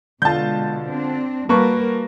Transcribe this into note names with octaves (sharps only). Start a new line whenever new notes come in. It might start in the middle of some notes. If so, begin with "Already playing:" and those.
B2 D3 G#3 F4 A5 G6
C4 D4
G3 A#3 F#4 A#4 B4 A5 C#6